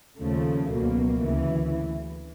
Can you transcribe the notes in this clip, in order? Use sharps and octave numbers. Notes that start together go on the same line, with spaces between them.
D#2 C#3 F3 A3
C#2 B2 F#3 A#3
D2 C#3 E3